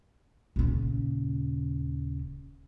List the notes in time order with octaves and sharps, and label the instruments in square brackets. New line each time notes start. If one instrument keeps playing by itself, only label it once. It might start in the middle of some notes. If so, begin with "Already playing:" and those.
[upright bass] D#1 C#3